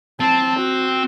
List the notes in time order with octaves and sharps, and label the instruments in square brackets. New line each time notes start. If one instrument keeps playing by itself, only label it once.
[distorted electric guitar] C4 [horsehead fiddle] A5
[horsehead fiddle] F#4